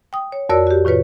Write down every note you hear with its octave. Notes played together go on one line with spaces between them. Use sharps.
G5 D#6
C#5
F2 F#4 A#4 C#5 D5 E6
F#4 G4
A2 D#3 F4 B4 C#5